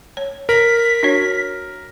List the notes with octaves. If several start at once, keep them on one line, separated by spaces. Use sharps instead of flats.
C#5
A#4 B6
D4 F#4 C#5